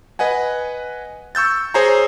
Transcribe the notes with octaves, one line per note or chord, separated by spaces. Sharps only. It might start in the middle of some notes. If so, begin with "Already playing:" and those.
B4 D#5 F#5 G#5
C#6 E6 G6 A6
G#4 C5 C#5 G#5 A#5